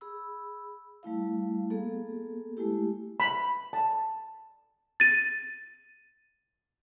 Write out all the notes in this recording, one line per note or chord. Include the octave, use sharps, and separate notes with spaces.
G#4 B5 E6
G3 A3 E4 F5
A#3 B3 G#4 A4
G#3 A3 E4 G4
B5
A5
A6 D#7